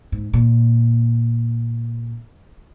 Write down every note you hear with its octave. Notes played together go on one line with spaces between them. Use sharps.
G#2
A#2